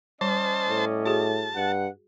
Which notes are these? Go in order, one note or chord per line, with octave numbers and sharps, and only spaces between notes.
G3 C#4 C5 D5 D#5 A5
A2
F#4 G#4 A5
G2 F#5